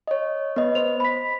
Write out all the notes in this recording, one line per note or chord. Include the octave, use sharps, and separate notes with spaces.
C#5 D#5
B3 B4 D#5
C5 F7
B5 B6